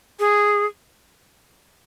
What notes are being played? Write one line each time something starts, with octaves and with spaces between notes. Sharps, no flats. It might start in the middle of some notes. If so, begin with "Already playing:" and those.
G#4